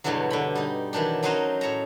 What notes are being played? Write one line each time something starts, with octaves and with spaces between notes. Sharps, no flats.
E2 G2 B2 D3 E3 F#3
D3 G5 B5
G3 D#4
D#3 E3 F#3 D4 G4
F#3 C#4 D#4 F#4 C5 D#5
A2 C#5 A5 A#5